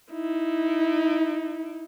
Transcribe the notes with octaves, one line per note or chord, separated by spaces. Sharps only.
D#4 E4